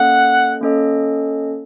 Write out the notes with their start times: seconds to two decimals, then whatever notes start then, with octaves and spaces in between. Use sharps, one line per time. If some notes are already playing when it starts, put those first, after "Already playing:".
Already playing: A#3 C#4 A4 D#5 F#5
0.61 A#3 C#4 A4 D#5